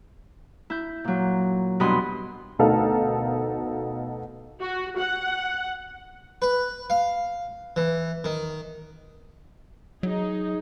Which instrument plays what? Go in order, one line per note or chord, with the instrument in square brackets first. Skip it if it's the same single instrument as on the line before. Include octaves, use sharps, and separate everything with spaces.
[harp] E4 G6
A#2 F#3
E2 G2 B2 D#5 B5 C6
[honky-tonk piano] D2 B2 D#4 A4 A#4 F5
[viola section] F#4
F#5
[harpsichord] B4
F5
E3
D#3
[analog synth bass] F#3 [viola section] D#4 G#4